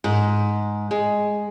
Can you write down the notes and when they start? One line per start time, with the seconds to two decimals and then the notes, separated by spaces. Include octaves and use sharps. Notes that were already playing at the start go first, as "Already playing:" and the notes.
0.04 G#2
0.91 G#3